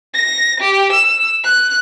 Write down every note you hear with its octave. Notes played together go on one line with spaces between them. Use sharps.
A#6
G4
E6
F#6